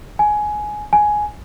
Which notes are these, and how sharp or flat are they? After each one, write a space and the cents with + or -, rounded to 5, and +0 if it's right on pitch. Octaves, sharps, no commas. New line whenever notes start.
G#5 +15
G#5 +10